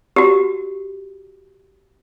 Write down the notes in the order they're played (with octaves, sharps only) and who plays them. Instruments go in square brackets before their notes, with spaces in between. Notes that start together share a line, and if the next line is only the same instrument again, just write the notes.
[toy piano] F#4 G4